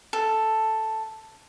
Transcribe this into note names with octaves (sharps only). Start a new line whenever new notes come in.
A4